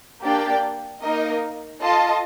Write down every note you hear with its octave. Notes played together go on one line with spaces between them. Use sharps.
A#3 D4 G4 D5 G5
A#3 D#4 A#4 D#5
F4 A4 D#5 A5